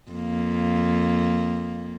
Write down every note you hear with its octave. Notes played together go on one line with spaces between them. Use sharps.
F2 A#3